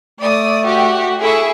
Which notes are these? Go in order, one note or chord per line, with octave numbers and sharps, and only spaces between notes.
A3 D5 D#6
F#4 G4
E4 G#4 A4 E5 C#6